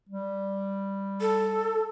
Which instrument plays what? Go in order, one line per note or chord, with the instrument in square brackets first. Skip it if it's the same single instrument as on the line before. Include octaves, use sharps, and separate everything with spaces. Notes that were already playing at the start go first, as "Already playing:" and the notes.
[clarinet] G3
[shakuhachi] A4